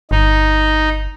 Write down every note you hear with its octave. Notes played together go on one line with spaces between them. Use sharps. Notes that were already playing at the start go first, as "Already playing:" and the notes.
G1 D#4